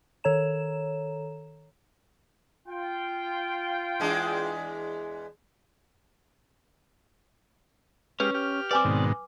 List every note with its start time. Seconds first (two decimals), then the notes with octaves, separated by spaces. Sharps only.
0.24 D#3 A4 C#5 A#5 E7
2.68 F4 G5
4.00 E2 G#3 D4
8.20 G#3 C#4 G4 B4 F6
8.34 G4 F6
8.71 C4 B4 D5 G#5 D6
8.85 G#2 B2 D#3